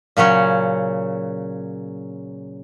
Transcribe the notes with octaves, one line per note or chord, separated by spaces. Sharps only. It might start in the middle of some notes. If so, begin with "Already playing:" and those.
A#2 C#3 F#3 C#4